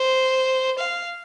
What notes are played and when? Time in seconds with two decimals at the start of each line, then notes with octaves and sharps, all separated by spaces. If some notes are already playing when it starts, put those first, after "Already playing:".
Already playing: C5
0.78 F5